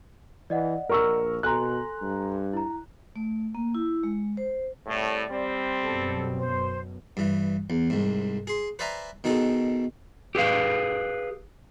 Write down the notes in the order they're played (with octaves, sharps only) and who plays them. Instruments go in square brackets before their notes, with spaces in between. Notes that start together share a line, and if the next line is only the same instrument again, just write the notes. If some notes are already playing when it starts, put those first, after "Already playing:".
[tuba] E3 [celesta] D5 D#5 F#5
[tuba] A#1 [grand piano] A#4 C#6 E6
[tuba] B2 [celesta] A4 G#5 C6 [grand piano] A#5 F#6
[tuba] G2
[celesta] E4 A#5
[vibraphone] A3
A#3
E4
G#3
C5
[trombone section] C2 A2 [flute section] D5
[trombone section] G3 C4
[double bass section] F#2 B2 [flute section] A4
[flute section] C5
[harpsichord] G2 E3
E2
C2 G#2
G#4 C6
B4 C5 D5 E5 G#5 A#5
B2 D#3 D#4 G#4 A4
[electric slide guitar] G4 G#4 B4 F5